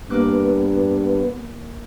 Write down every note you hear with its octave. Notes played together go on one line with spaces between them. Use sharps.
G2 A#3 B3 D6 F#6